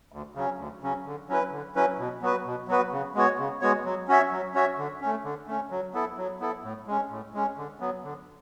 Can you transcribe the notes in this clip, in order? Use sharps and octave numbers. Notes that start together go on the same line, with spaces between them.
D2
C#3 F#3 C#4
D2
C#3 F#3 C#4
D3
F#3 C#4 E4 B4
D3
F#3 C#4 E4 B4
B2
F#3 B3 F#4 B4
B2
F#3 B3 F#4 B4
C#3
G#3 B3 F#4 C#5
C#3
G#3 B3 F#4 C#5
F#3
C#4 F#4 C#5 E5
F#3
C#4 F#4 C#5 E5
D3
A3 C#4
D3
A3 C#4
F#3
B3 E4 A4
F#3
B3 E4 A4
A2
G#3 C#4
A2
G#3 C#4
D3
F#3 B3
D3